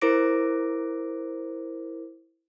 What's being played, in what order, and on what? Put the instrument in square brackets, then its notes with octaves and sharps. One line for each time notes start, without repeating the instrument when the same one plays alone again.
[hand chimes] E4 A#4 C5 D6 A#6 D7